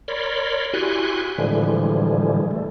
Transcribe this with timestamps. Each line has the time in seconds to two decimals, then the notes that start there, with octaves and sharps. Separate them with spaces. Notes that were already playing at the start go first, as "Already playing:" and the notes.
0.08 A#4 C#5 D5 B5 C6
0.74 E4 F#4 G4 G#5 C6 F#6
1.38 A2 D3 E3 F3 G3 G#3
2.51 A3